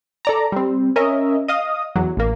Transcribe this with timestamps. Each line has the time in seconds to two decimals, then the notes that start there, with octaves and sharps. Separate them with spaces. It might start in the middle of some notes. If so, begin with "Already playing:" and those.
0.25 A4 D5 A#5
0.52 G3 C4
0.96 C#4 A#4 D#5 E5
1.48 D#5 F5 D#6
1.96 E2 F#3
2.17 A1 A#3